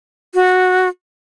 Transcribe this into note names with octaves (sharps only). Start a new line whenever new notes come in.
F#4